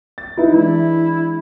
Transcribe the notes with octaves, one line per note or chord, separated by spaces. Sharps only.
A6
D#4 E4 B4
E3 G#3 D4 E4